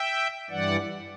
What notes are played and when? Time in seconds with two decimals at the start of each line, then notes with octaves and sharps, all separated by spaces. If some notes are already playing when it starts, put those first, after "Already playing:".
Already playing: E5 G5
0.50 G2 E3 G3 D5 F#5